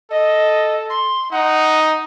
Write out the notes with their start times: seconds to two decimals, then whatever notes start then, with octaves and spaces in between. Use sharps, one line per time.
0.11 A4 D#5
0.90 C6
1.32 D#4 F#5